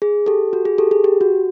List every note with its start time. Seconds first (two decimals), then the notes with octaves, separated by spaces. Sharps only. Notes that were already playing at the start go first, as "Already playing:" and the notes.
0.02 G#4
0.26 G4 A4
0.53 F#4
0.65 G#4
0.78 G4 A4
0.91 G#4
1.04 G4
1.21 F#4